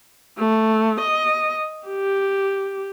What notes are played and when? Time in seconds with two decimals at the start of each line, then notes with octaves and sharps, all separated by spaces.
0.38 A3
1.01 D#5
1.88 G4